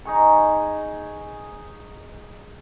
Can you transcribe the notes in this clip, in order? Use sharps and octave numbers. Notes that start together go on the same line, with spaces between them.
D#4 G#4 C#6